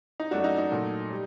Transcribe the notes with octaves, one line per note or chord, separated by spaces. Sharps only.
D#4
F#2 F#3 A3 D4 F#4
D#4
D#4
A#2 F#3 A3
G3